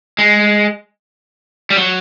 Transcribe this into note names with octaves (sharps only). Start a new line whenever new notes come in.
G#3
G3
F#3